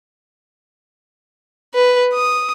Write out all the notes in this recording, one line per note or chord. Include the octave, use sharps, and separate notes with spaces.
B4
D#6